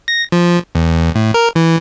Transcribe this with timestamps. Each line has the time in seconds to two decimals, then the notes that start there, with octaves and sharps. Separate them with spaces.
0.08 A#6
0.32 F3
0.75 E2
1.15 A2
1.34 A#4
1.56 E3